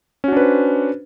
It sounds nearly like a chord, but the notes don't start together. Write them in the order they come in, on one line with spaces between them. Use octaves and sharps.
C#4 F#4 D4 B4 C5